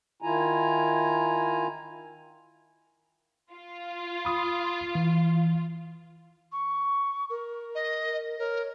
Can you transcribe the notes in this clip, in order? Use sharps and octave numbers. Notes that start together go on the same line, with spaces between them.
D#3 E4 F4 G#5 A#5
F4
B5 D#6
E3
C#6
A#4
D#5
A#4 C#5